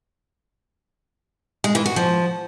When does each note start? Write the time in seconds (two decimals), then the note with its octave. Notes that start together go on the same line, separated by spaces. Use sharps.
1.64 G#3
1.75 E3
1.86 F#4
1.96 F3